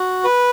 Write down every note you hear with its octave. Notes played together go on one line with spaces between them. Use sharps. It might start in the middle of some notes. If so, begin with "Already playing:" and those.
Already playing: F#4
B4